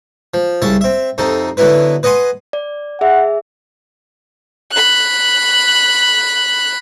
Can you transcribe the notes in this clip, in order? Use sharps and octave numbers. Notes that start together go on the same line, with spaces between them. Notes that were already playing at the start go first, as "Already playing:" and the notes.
F3
C2 C#3 E5 A5
C4 E5
F2 C3 D#4 A4
D3 F#3 B3 E4 B4
B4 D#5 F#5 G#5 C6
D5
G#4 E5 F#5
B5 F#6